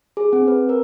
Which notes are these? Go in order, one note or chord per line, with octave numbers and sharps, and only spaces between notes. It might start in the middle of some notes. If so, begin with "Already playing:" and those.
G#4
C4
B4
A#4